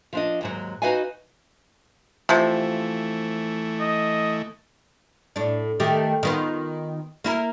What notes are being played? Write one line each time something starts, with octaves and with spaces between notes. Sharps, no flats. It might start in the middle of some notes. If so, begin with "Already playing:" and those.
F3 D4 D#5
D#2 G#2 F#3
D#4 F#4 B4 D#5 F5 G#5
C3 E3 F3 A3
D#5
A2 D4
D#3 A3 G4
D#3 B3 F4
A#3 E4 A#4